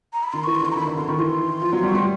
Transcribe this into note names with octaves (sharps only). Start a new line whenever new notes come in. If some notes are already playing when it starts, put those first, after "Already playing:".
A#5
B5
D#3 C6
E3 C#6
C6
D3 C#6
C6
A#5
D#3 B5
D3
D3 C6
D#3 C#6
E3 C6
F3
F#3
G3
C#6
G3 C6